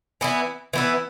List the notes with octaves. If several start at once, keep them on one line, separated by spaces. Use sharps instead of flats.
E3 B3 E4
E3 B3 E4